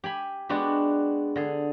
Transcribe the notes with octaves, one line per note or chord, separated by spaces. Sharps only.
G4 G#5 B5
G#3 B3 D4 F#4 G4
D3 G#4